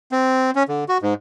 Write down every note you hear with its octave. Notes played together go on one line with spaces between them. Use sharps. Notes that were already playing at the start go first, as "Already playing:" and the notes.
C4
C#4
D3
F#4
G#2